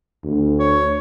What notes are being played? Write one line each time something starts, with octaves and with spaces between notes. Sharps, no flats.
D2
C#5